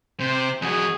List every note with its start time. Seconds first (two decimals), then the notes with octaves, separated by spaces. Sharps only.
0.20 C3 C5
0.62 F2 F#4 G#4